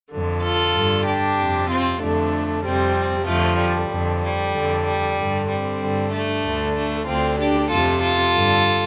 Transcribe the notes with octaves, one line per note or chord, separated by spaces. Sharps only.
F2 D3
F4 A4
G2 D3
D4 G4
F2 C3
C4 F4
F2 D3 A3 D4
F2 C3 G3 C4
F2 D3 F3 A3
G3
F2 D3
G3
F2 D3
G3
G2 D3
G3 C4
G2 D3
A3 D4
D2 D3
A3 D4
D2 D3 C4 F4
D4 G4
F2 C3 F4 A4
F4 A4
G2 D3